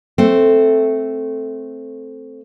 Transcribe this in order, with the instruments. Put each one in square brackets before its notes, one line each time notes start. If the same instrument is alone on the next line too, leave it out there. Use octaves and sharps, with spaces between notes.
[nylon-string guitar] A3 C4